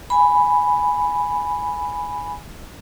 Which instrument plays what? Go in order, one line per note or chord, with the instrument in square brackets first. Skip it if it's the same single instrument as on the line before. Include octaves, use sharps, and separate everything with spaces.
[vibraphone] G#5 B5